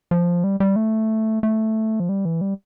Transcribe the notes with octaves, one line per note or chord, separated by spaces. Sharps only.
F3
G3
G3
A3
A3
F3
G3
E3
G3